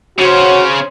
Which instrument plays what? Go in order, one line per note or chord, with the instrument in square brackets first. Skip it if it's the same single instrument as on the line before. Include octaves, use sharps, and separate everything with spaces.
[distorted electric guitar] C#3 C#4 [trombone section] F#4 [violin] C5 C#5